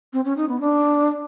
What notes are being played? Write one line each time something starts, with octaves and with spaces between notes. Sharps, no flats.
C4
C#4
D#4
B3
D4